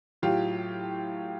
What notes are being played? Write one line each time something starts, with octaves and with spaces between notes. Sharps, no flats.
A2 F#3 F4 G4